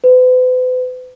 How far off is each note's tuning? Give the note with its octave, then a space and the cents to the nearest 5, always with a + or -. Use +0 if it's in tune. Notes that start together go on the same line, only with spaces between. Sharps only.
B4 +45